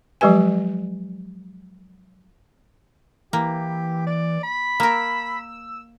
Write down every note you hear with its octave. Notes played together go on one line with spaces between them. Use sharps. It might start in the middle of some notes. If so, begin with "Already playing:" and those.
F3 F#3 G#3 G4 B4 G#5
E3 A#3 G4
D5
B5
A#3 A#4 E6